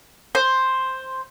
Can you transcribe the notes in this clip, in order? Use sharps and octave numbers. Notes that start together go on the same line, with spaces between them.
C5